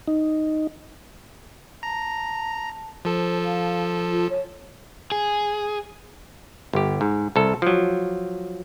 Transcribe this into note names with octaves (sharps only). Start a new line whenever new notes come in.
D#4
A5 A#5
F3 A4 C5
F5
F4
C#5
G#4
G1 G4
G#2
C2 A4
F3 F#3